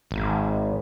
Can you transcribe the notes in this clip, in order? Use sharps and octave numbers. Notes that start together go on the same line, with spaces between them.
G#1